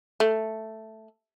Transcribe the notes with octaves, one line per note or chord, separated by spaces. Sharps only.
A3